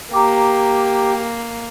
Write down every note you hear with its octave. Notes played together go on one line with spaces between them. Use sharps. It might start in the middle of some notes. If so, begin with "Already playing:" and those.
A#3 G4 A#5 D6